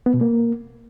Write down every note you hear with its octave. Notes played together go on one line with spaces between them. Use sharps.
B3
B2
A#3